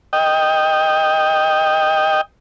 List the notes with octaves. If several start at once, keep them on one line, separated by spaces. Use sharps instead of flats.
D#5 G5